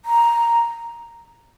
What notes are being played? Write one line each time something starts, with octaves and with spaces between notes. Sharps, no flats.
A#5